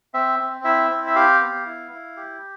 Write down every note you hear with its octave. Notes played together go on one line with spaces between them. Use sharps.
C4 E5
C4
E4 E5
C4
E5
G4 F5
B3
E4
E4
G4